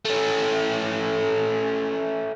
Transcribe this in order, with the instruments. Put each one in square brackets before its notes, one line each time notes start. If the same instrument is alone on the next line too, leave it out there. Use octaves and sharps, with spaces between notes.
[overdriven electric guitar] A3 C#4